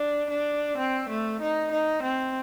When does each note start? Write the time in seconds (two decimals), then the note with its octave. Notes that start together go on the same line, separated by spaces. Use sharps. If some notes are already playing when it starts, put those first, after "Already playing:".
Already playing: D4
0.30 D4
0.77 C4
1.09 A3
1.41 D#4
1.72 D#4
2.03 C4